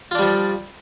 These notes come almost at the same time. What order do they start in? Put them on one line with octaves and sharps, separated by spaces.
F4 D4 G3 F3